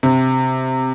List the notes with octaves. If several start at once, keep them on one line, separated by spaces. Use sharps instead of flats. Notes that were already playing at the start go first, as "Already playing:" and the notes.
C3